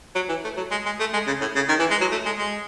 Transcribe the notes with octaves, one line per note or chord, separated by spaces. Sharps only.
F#3
E3
A3
F#3
G#3
G#3
A3
G#3
C#3
A2
C#3
D#3
E3
G#3
F#3
A3
G#3
G#3